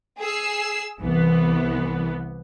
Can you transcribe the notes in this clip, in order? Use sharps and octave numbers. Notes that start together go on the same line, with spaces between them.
G#4 E6 C7
C2 E3 B3